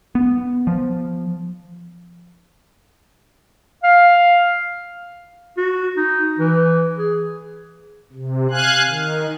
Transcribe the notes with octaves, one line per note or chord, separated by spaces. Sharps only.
B3
F3
F5
F#4
D#4
E3
G#4
C3
F5 G#5 F#6
D#3